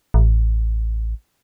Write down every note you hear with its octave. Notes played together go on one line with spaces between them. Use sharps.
A1